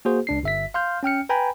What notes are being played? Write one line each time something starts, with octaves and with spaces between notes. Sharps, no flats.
A#3 F#4 G#4 C5
C#2 D4 C7
G1 E5 B6
F5 C6 F6 G6
C#4 G5 F6 C#7
B4 G5 G#5 A#5 B5